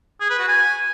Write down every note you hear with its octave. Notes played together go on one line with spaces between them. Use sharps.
G#4
B4
F#4
G#5